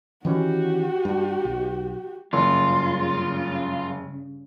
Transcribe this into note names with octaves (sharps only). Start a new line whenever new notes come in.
D#3 E3 C#4 F#4 G4
G2
B1
F#1 G2 C#3 F4